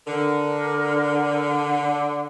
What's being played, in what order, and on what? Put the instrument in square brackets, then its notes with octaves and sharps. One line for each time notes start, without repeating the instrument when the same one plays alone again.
[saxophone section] D3 [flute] A#4